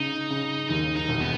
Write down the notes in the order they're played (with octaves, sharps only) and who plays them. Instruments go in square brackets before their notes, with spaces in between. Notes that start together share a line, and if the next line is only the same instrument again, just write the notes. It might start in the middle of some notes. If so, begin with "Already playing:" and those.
Already playing: [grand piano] C#3 [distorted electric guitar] D#4
[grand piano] C#3
[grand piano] D#2 [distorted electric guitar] D#4
[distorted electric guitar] D#4
[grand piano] E1
[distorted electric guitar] B3